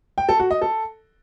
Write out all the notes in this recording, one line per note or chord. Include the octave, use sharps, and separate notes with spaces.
G5
A4
F#4
D#5
A4